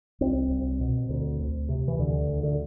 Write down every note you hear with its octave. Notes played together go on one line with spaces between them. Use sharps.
C2 C4
C2
B2
D2
D2
C3
E3
D2 D3
D2
D3